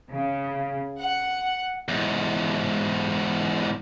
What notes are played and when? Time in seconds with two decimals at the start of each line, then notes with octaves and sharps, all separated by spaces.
0.11 C#3
1.00 F#5
1.88 E2 G#2